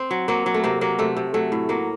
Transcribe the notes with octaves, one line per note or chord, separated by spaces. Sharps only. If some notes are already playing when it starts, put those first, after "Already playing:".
Already playing: C4
F#3
F#3 A#3
F#3
A3
C3 A#3
F#3 A#3
C3 A3
C3
F#3 A3
A2
F#3 A#3